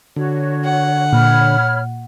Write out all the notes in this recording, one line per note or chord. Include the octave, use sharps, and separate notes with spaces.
D3 F#4 C#5
F#5
A#2 C#5 B5 F6